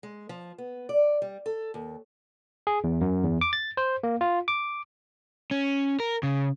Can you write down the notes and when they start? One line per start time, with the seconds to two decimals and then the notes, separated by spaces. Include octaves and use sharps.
0.03 G#3
0.29 F3
0.58 B3
0.89 D5
1.22 G3
1.46 A4
1.74 D#2
2.67 G#4
2.84 E2
3.01 F#2
3.23 E2
3.41 D6
3.53 A6
3.77 C5
4.03 A#3
4.21 F4
4.48 D6
5.51 C#4
6.00 A#4
6.23 C#3